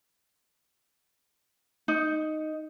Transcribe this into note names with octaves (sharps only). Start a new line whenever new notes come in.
D#4